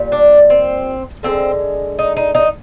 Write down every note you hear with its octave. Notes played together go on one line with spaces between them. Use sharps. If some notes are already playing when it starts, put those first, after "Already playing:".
Already playing: A#2 G3
D4
C4
D3 F3 G#3 C4
D#4
D#4
D#4